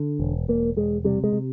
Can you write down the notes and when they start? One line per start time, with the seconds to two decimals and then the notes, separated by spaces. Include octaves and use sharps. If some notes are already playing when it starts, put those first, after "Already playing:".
Already playing: D3
0.20 E1
0.48 E1 A#3
0.76 E1 G#3
1.04 C3 G3
1.24 G#3
1.33 C3